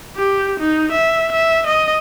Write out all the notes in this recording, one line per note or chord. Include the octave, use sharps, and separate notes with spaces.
G4
D#4
E5
E5
D#5